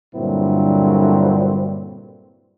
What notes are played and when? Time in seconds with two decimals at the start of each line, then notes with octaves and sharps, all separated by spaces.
0.15 G2 A#2 D3 F#3 C4 E4